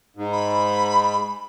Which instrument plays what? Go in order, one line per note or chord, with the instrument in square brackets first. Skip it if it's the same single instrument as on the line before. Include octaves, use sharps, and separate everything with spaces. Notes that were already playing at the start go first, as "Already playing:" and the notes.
[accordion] G#2
[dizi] B5